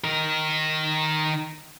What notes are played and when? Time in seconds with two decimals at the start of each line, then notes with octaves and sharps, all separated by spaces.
0.04 D#3 A#4